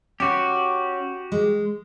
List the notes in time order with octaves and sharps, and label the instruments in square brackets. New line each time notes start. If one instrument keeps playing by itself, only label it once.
[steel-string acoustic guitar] C#4 [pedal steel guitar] F#4 G4
[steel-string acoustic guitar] G#3